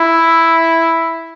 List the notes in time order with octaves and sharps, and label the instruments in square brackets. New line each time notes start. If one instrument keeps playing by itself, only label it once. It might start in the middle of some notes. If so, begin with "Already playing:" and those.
Already playing: [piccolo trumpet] E4